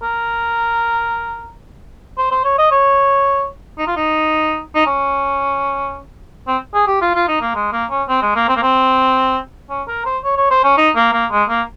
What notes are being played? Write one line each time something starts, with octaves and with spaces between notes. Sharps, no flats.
A#4
C5
C5
C#5
D#5
C#5
D#4
F4
D#4
D#4
C#4
C4
G#4
G4
F4
F4
D#4
A#3
G#3
A#3
C#4
C4
G#3
A#3
C4
A#3
C4
C#4
A#4
C5
C#5
C#5
C5
C#4
D#4
A#3
A#3
G#3
A#3